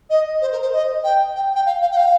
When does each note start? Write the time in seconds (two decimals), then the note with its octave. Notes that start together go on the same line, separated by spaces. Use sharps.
0.10 D#5
0.41 C5
0.51 A#4
0.61 C5
0.72 D#5
1.03 G5
1.35 G5
1.55 G5
1.66 F5
1.81 F5
1.91 G5
1.96 F5